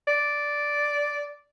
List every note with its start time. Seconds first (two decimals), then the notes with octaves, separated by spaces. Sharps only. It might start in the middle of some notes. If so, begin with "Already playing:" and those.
0.08 D5